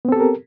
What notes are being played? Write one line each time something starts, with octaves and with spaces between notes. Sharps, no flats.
B3 C4 G4 A4 A#4